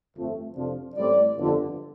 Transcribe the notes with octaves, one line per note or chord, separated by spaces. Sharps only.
G1 F2 F3 A3 C4
F2 C3 F3 D4 F4
A1 A2 G3 C4 D5
G1 F2 D3